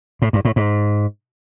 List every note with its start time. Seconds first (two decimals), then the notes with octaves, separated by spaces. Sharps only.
0.22 A2
0.33 G2
0.45 A2
0.56 G#2